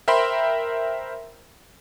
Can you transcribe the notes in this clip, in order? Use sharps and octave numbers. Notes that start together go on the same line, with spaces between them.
A#4 C5 E5 G5 B5 C6